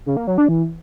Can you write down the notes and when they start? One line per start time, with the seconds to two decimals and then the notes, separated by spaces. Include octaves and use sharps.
0.06 C#3
0.17 A#3
0.27 F#3
0.38 D4
0.49 E3